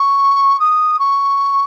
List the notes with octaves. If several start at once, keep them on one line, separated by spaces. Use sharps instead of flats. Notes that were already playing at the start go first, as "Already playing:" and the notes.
Already playing: C#6
D#6
C#6